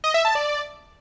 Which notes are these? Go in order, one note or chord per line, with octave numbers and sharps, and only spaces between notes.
D#5
E5
A5
D5